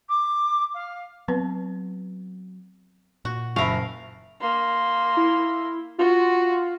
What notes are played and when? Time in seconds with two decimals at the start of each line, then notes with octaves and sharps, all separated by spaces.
0.09 D6
0.74 F5
1.28 F#3 B3 C4 B4
3.25 A#2 F#4
3.56 F#1 A#4 E5 F5 B5 C#6
4.41 A#3 C6
5.17 E4
5.98 F4 F#4